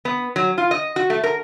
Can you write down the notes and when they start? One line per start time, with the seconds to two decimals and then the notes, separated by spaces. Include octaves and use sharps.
0.05 B3
0.36 F#3
0.58 F4
0.71 D#5
0.96 F#4
1.10 A3
1.24 A#4